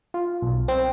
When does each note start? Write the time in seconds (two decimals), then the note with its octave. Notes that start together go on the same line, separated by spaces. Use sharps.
0.14 F4
0.42 B1
0.68 C4